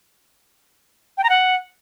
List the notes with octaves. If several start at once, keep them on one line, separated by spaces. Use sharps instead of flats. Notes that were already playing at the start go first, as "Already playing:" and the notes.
G5
A#5
F#5